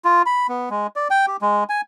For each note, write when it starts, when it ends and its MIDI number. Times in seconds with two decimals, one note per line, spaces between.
0.05 0.22 65
0.26 0.47 83
0.49 0.69 59
0.70 0.87 56
0.96 1.08 74
1.10 1.26 79
1.28 1.37 67
1.42 1.64 56
1.69 1.81 80